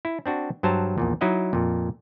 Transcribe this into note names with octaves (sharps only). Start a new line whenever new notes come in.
E4
C4 D4 F#4
G2 F#3 C5 A5 A#5
A#1 E2 A#2
F#3 D#4 E4 D#5 F#5
F2 A#2